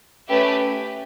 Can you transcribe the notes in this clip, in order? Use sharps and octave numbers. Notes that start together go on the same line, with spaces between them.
A3 C#4 G4 B4 E5